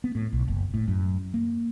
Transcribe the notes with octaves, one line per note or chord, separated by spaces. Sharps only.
B3
A2
B1
F#1
A2
F#2
A#3